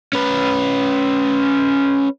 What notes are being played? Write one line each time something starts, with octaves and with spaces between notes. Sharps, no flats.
C#4 B4